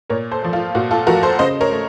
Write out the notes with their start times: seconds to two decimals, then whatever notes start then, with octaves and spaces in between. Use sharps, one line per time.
0.10 A#2 A#4 C#5
0.31 A4 C5
0.42 F3 A3
0.53 F4
0.75 A#2 F#4
0.91 F4 A4
1.07 F3 A3 F#4 A#4
1.23 A4 C5
1.39 C#3 C5 D#5
1.61 A#4 C#5
1.72 A3